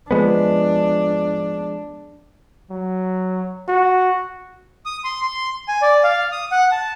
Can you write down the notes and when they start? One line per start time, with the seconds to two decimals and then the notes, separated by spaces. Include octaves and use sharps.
0.11 F3 G#3 B3 D4
2.71 F#3
3.68 F#4
4.86 D#6
5.04 C6
5.22 C6
5.68 G#5
5.82 D5
6.04 F5
6.32 D#6
6.52 F#5
6.71 A5